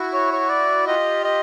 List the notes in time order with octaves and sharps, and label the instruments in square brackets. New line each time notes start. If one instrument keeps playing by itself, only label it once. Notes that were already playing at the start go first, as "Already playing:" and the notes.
Already playing: [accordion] E4 F#4
[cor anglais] C#5
C#5
D5
[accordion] F4 G4 [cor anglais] D#5
[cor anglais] D#5